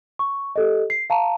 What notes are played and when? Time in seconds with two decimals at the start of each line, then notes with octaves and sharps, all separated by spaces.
0.19 C#6
0.56 G4 A4 D#5
0.90 C7
1.10 F5 A5 A#5